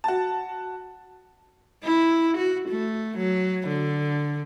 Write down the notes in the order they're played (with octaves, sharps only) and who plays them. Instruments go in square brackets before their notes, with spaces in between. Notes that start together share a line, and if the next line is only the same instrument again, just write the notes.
[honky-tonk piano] F#4 A5
[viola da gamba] E4
F#4
A3
F#3
D3